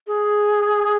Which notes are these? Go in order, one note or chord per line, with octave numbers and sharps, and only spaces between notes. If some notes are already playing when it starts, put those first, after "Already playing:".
G#4